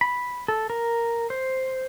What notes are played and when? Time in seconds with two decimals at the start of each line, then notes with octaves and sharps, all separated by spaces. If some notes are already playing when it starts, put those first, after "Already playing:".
0.01 B5
0.48 A4
0.70 A#4
1.30 C5